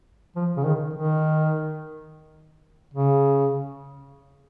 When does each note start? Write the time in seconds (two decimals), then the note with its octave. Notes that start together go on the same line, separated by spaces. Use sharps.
0.36 F3
0.57 C#3
0.64 D#3
0.94 D#3
2.94 C#3